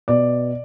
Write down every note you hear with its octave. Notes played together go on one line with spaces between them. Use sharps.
B2 D5